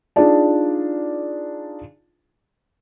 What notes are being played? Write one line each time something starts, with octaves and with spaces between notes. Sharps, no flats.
D4 D#4 F4 G#4 D5 A5